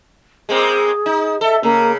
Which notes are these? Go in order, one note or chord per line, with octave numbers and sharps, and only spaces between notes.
G#3 A#3 C4 G#4
D#4
A4 E5
C#3 A#3